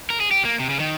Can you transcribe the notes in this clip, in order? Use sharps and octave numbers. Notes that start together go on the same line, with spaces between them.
A#4
G#4
G4
A#3
C3
C#3
D#3